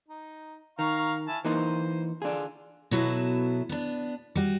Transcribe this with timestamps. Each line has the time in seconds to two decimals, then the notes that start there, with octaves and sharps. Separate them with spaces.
0.08 D#4
0.79 D#3 F5 A#5 C#6
1.28 E4 G#5 A5
1.45 E3 A#3 D#4 C5
2.22 D3 D4 F4 G#4
2.91 B2 F#3 B3 E4 A4
3.69 B3 D4
4.35 G3 F#4